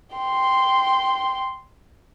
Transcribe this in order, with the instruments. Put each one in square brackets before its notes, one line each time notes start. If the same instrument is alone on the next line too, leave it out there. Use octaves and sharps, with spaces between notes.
[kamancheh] G5 C6